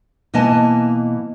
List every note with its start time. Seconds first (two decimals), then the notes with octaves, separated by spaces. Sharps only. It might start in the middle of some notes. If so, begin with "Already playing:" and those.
0.34 B2 E3 A#3 D#5 G#5 A5